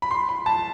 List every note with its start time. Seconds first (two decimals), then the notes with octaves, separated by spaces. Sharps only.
0.02 B5
0.11 C6
0.29 B5
0.46 A5